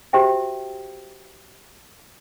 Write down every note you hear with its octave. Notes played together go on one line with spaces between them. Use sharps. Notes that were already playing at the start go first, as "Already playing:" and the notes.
F#4 G4 C5 E5 G5